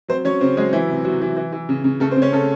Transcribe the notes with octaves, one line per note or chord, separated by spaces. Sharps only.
F#3 C4 C5
F#3 C#4 C#5
C#3 C4 C5
F#3 G#3 G#4
E3 E4
C3
C3 F#3 F#4
E3
E3
E3
C#3
C#3
C#3 A3 A4
C4 C5
C#3
C#4 C#5
C#3 A3 A4